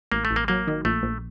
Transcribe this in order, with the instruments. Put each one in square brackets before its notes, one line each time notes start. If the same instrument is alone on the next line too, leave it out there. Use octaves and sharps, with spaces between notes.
[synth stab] A1 [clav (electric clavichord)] A#3
[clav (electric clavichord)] A3
[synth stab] A1
[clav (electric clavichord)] A#3
[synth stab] F#3 [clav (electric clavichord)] A#3
[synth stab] D#3
[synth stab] A#1 [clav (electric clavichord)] A3
[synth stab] A#1